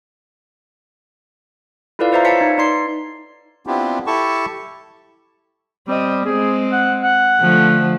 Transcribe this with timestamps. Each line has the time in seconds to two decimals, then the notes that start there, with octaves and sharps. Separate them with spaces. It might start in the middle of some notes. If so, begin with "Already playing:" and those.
1.99 E4 F4 A4 B4 D5 F5
2.12 B4 C5 D5 E5 F5 A#5
2.25 B4 C#5 A5 B6 C#7
2.41 D#4
2.58 D#4 D5 C6 C7
3.67 B3 C4 D4 E4 F4 G4
4.07 E4 G4 A4 A5 C#6
5.88 G3 C4 D#5
6.26 G#3 C4 G#4
6.72 F#5
7.03 F#5
7.40 D3 F3 A3